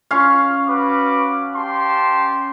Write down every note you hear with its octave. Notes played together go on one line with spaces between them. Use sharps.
C#4 F5 C#6
F#4 B4 D6
G4 A5 C6